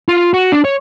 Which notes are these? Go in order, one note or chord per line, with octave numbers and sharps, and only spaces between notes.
F4
F#4
D4
C#5